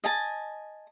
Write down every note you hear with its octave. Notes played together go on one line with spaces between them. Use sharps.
D#5 G#5 A5